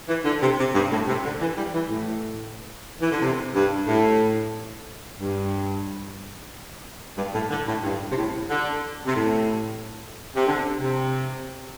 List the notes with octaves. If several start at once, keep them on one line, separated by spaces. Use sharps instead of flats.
E3
D3
C3
C3
G2
A2
C3
D3
E3
G3
E3
A2
E3
D3
C3
G2
A2
G2
G2
A2
D3
A2
G2
C3
A2
D3
C3
A2
C3
D3
C3